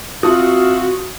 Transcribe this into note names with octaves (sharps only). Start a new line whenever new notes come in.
C4 F4 F#4 E5 F5 A5 D#6